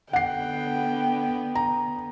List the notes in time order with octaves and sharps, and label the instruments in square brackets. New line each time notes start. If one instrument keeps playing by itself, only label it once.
[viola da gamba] D3 B3 [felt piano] F#5 C7 [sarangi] G5
[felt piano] A#5